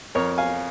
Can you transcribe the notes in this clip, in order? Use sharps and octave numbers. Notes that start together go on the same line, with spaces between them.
F2 A#4 C#5
F5 G#5